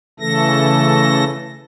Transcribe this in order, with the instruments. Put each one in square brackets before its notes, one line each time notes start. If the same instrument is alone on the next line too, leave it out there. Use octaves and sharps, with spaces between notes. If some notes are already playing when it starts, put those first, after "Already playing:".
[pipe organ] C#3 E3 A3 A4 A#6